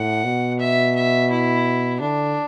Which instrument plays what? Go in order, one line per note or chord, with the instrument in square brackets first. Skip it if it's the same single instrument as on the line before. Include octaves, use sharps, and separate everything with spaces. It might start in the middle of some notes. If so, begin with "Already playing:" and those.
Already playing: [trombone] A2 [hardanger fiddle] F#5
[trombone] B2
[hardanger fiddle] E5
E5
E4
[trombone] D3 [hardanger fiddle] D4